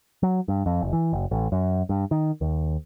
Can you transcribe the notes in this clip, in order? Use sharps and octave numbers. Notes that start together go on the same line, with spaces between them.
F#3
G2
F2
F#1
E3
F#1
A1
F#2
G2
D#3
D#2